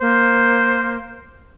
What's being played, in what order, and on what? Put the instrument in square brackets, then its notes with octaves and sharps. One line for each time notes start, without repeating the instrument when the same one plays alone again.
[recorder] A#3 [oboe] C5